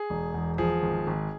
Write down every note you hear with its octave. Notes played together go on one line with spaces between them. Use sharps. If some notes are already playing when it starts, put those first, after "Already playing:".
Already playing: G#4
E1
E2
F3 G#4
G#1
G#1